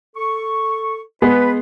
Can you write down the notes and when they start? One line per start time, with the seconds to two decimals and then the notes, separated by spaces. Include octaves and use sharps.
0.15 A4 C#6
1.22 G#3 B3 G#4 B4